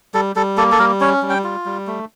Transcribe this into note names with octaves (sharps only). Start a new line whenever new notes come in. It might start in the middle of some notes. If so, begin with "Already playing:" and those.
G3 A4
G3 A4
A#3 A4
A4
G3 A#4
C#4 C#5
G3
G5
F4
G3
A3